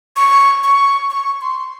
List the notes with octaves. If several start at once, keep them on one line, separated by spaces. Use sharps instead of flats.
C#6
C#6
C#6
C6